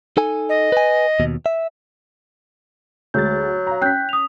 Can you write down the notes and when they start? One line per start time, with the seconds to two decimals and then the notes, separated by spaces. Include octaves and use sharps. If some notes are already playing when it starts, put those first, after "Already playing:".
0.17 D#4 A4 G#5
0.49 D#5
0.72 B4 G#5
1.20 D#2 B2
1.46 E5
3.14 D2 F#3 G#3 G6 A6
3.67 F5 A#5
3.82 C#4 G5 F#6 G6 B6
4.09 D#6 F7